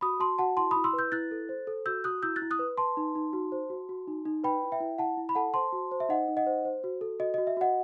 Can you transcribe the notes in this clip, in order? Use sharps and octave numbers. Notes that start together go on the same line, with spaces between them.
F#4 B5 D#6
F#4 A5 C6
F#4 F#5 A5
E4 A5 C6
E4 B5 D#6
C6 E6
B4
E6 G6
E4 F#6 A6
A4
C5
A4
F#4 E6 G6
F#4 D#6 F#6
E4 E6 G6
F#6 A6
E4
D#6 F#6
B4
B4 A5 C6
D#4
D#4
F#4
C5
F#4
F#4
D#4
D#4
B4 G5 B5
E4
E5 G5
E4
E4 F#5 A5
E4
B5
A4 F#5 A5
C5 A5 C6
F#4
C5
E5
D#4 D#5 F#5
D#4
D#5 F#5
C5
C5
F#4
A4
F#4 D#5
F#4 D#5
E5
F#4 D#5 F#5